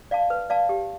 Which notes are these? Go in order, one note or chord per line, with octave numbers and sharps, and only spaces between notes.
D5 F5 A5
B4
D5 F5 A5
G4